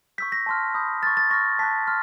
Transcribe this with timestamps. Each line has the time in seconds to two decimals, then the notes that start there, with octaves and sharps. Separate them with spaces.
0.18 C#6 E6 G6 B6
0.32 A#6
0.46 A5 C6 F6
0.75 B5 D#6 G6
1.03 C#6 F6 A6
1.17 A6
1.31 C#6 F6 A#6
1.59 A5 C#6 F#6 B6
1.88 C6 F6